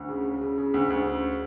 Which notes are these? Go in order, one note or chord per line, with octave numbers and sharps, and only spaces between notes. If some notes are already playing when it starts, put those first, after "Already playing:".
Already playing: D2
C#3
C#3
C#3
C#3
D2
D2
C#3